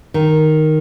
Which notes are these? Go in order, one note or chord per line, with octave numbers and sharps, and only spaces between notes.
D#3